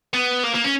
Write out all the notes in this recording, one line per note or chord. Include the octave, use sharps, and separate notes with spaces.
B3
A#3
A#3
C#4